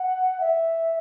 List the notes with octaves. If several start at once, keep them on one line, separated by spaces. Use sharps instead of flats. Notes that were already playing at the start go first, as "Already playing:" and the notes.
Already playing: F#5
E5